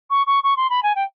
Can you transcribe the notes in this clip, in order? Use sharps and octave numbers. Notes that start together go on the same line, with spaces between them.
C#6
C#6
C#6
C6
B5
G#5
G5